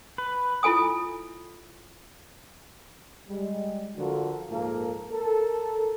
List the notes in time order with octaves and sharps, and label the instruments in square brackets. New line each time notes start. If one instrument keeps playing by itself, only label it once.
[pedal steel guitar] B4
[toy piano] E4 F4 A4 G#5 D#6
[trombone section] G3 G#3
D3 F3 F4 F#4 A4 A#4
A#1 G#2 A#3 F4 A4 A#4
A4 A#4